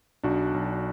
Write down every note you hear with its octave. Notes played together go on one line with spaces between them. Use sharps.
B1 D4 F#4
B1